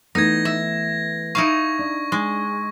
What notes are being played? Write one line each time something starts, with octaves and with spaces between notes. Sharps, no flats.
E3 A3 B3 D#4 G#6 A#6
E5
D#4 E4 F5 C#6
D4
G#3